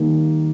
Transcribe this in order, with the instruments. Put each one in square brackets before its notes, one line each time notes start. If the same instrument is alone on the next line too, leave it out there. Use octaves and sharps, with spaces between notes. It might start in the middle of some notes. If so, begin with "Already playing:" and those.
Already playing: [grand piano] D#3 G3 A#3 D#4